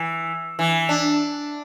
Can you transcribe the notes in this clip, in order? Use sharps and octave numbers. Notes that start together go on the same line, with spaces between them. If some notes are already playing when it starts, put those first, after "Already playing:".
Already playing: E3
E3
D4